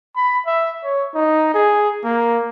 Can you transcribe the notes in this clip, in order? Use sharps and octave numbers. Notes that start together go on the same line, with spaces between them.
B5
E5
C#5
D#4
G#4
A#3